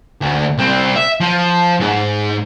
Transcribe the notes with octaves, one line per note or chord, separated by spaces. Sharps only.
D2
C2 C4
E5
F3
G#2